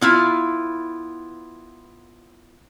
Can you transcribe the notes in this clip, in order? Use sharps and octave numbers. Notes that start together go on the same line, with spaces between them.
B3 E4 F4